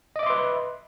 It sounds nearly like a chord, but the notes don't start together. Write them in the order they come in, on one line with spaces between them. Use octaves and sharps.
D#5 D6 E5 C6 B4